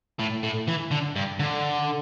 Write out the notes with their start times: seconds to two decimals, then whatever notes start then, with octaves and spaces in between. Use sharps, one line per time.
0.19 A2
0.43 A2
0.68 E3
0.91 D3
1.16 G2
1.40 D3